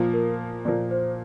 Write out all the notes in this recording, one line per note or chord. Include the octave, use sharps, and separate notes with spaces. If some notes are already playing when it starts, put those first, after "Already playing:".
Already playing: A#2 F3 A#3
A#4
A#2 F3 A#3 D5
C5